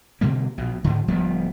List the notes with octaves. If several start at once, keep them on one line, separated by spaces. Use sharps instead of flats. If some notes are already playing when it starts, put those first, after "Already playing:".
B2 D3 G3 A#3
A#1 B2
G#2 D3
D1 F3 G3 B3